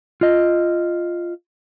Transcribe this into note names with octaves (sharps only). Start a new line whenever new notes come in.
F4 D#5